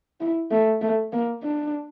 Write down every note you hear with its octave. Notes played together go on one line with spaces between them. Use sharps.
E4
A3
A3
A#3
D4